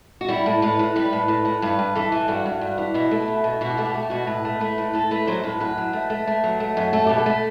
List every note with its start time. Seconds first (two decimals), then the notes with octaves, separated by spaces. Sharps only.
0.21 F#4
0.28 G3 E4
0.46 A2
0.62 A2 B4
0.79 A2
0.96 G3 B4
1.13 A2
1.28 A2
1.45 A2
1.62 G2 B4
1.79 G2
1.95 E3 A4
2.12 E3
2.28 G2 F#4
2.46 G2
2.61 G2
2.78 E3
2.94 B2 E4
3.11 A3
3.28 B2
3.44 B2
3.61 B2 F#4
3.70 G4
3.77 A3 F#4
3.85 G4
3.94 A3 F#4
4.03 G4
4.10 B2 F#4
4.27 A2 B4
4.45 A3
4.60 A3 B4
4.78 A2
4.93 A2 A4
5.11 A3 B4
5.27 F#3 C5
5.43 A2 B4
5.60 F#2 B4
5.78 F#3
5.93 A3
6.10 A3
6.27 A3
6.44 F#3
6.60 A3
6.77 F#2
6.93 A3 A4
7.06 B2 G4
7.18 A4
7.26 A3